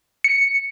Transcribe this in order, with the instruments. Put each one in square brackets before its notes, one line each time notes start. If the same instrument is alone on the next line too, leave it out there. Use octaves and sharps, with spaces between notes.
[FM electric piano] C#7